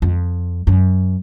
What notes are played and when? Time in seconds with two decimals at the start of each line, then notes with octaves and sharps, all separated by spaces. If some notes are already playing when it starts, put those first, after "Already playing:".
0.02 F2
0.67 F#2